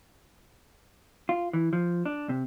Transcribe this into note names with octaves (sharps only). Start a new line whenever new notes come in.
F4
E3
F3
D4
C3